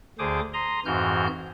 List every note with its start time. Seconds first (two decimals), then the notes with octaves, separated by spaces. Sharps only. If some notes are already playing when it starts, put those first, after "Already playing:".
0.19 D2 D3 G#4 C5 D6 D#6
0.53 A#5 C6 D#6
0.85 F2 G#2 E3 F#4 F6 G6